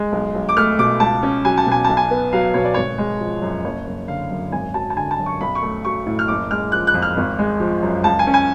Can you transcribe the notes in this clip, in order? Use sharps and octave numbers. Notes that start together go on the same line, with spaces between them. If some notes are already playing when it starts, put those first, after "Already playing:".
Already playing: G#3
B1
B1
D6
A3 F6
B2 D6
C#2 A5
C#4
F#3 G#5
A5
B2 G#5
B1 A5
G#5
B3
F#3 F5
B2 C#5
D5
G#1 C#5
G#3
F3
F#2
F#1 C#5
F#1
D3 F5
F#2
G#1 G#5
F#3 A5
A5
D3 G#5
A5
F#2
C#6
B1 B5
C#6
A3
F#3 C#6
A2
F6
F#1 D6
G#3 F6
F3 F#6
F#6
F2
F6
G#1
G#3
F3
F#2
C#2 A5
G#5
C#4
G#5